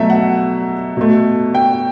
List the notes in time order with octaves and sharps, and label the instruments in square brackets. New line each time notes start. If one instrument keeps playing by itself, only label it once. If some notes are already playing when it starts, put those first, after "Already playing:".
Already playing: [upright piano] B2 F#3 A3 E5
F#5
B2 A3
G5